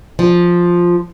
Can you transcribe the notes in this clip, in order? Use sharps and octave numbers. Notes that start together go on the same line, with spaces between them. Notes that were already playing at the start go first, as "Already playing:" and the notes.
F3